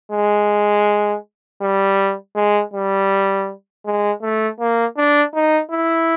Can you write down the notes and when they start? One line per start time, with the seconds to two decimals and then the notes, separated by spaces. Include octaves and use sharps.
0.12 G#3
1.62 G3
2.36 G#3
2.74 G3
3.86 G#3
4.22 A3
4.60 A#3
4.97 D4
5.35 D#4
5.71 E4